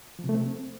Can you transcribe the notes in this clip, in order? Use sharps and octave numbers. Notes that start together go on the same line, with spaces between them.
F3
C3
A3
C4